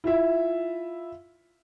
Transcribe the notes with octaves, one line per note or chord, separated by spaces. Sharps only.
E4 F4 E5